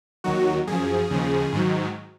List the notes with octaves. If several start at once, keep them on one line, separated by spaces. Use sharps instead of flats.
D#2 D#3 F#3 F#4
F#2 F3 G#4
D#2 C#3 F3
G#2 D#3 F#3